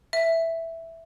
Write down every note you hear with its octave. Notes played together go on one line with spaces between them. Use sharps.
E5